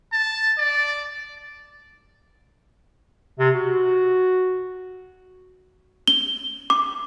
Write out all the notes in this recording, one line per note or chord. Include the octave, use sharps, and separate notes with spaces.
A5
D5
C3
F#4
G7
D6